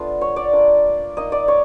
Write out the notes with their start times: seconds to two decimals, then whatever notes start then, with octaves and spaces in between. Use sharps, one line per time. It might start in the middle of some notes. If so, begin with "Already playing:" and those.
Already playing: A3 B3 D4 F4
0.21 C#5
0.36 D5
0.53 A#3 D4 F4
1.17 A#3 D#4 D#5
1.32 D5
1.48 C#5